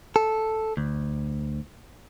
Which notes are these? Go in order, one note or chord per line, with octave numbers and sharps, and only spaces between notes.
A4
D2